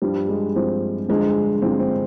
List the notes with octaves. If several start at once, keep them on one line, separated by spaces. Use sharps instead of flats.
G2 F3 G3
G#3
G2 F3 C4
G2 D3 F3 G#3
G2 D3 F3 C4
C4